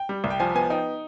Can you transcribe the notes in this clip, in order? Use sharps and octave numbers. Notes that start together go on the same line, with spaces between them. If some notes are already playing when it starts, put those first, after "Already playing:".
Already playing: G5
G3
C2
G5
F3 G#5
B3 G#5
D#4 G5